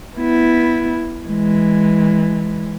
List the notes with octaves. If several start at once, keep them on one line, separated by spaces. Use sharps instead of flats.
B3 E4
E3 G#3